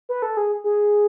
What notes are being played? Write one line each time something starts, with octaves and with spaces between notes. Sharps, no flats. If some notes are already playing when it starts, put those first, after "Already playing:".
B4
A4
G#4
G#4